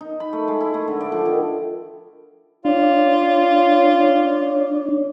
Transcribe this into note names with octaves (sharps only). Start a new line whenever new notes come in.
D#4
B5
A3
G#3
E4
A3
D3
D5
F3
D#3
D4 F4 C#5